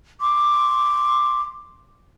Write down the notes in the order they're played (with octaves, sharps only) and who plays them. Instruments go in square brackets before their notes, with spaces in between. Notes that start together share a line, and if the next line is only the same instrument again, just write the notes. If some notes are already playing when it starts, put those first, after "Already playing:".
[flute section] C6 D6